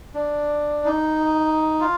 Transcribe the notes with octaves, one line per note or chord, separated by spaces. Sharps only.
D4
D#4
F4